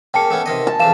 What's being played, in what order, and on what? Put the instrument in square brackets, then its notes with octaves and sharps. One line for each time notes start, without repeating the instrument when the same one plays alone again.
[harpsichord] C#3 A#3 [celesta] G5 A5 C#7
[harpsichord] A3 B3 C#4
C3 D#3 D#5
[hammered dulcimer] A5
[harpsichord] F2 C#3 E3 [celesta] F5 E7